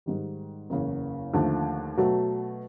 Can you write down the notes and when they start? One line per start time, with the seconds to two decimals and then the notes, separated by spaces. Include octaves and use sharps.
0.06 G#2 D#3 G3
0.70 F#1 E2 C#3
1.34 D#2 D3 F3 A3
1.97 B2 F#3 A3